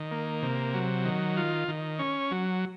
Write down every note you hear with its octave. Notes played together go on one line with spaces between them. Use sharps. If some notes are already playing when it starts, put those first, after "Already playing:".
Already playing: D#3
A#3
C3
F#3
D#3
F4
D#3
C#4
F#3